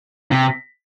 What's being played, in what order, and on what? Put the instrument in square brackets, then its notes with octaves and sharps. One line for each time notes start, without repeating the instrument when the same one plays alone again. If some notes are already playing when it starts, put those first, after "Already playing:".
[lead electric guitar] C3